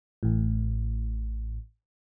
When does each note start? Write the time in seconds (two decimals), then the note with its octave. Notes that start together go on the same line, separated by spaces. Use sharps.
0.23 A1 A2